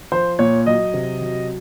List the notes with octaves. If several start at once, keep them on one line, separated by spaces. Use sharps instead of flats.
F3 C5
A#2 C#5
F#3 D#5
C3
F#3